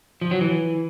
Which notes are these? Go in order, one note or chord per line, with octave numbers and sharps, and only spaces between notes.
F3
F#3
E3